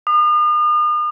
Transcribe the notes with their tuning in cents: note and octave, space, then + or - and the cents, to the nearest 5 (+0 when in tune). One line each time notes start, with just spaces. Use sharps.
D#6 -40